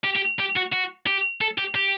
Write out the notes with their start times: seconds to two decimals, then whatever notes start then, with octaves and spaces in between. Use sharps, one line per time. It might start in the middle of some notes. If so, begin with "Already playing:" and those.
0.04 G4
0.16 G4
0.39 G4
0.56 F#4
0.72 F#4
1.06 G4
1.41 A4
1.58 G4
1.75 G4